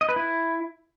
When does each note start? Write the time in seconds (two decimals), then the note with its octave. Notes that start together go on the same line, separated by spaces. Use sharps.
0.01 D#5
0.09 B4
0.16 E4